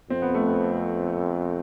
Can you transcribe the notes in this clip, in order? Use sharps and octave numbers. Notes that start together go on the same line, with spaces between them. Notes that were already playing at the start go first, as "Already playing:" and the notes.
F2 C4
B3
A3
B3